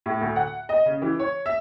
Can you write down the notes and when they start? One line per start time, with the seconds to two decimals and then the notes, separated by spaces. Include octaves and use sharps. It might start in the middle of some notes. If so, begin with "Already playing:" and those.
0.06 A2
0.21 D2
0.36 F#5
0.69 D#5
0.86 C#3
1.02 E3
1.19 C#5
1.46 E5